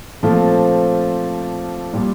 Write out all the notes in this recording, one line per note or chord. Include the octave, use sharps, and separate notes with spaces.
A#2 F3 A3 C4 F4
A#2 G3